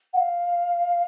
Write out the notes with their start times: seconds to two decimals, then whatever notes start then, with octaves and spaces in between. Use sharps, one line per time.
0.13 F#5
0.17 F5